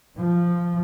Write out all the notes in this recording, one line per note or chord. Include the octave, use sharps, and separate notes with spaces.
F3